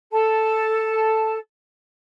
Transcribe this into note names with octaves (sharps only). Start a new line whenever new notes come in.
A4 A5